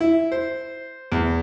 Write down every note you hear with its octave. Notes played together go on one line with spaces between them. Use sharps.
E4
C5
E2